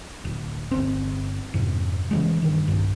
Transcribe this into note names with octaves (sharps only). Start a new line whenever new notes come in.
D1
G1 C4
F2 G#2 C3
C#3 E3 G#3
G2 D#3
B1 G2